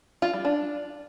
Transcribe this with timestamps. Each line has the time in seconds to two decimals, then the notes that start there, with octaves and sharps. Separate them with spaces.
0.22 F4
0.33 G3
0.45 D4